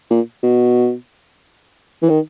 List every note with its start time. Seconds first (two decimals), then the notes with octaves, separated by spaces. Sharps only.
0.10 A#2
0.43 B2
2.02 E3
2.09 D#3